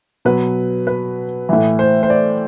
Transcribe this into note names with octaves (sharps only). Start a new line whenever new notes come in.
B2 F#3 B4
B4
A2 E3
C5
C5
D5